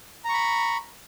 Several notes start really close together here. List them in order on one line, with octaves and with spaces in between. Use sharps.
A#5 C#6 B5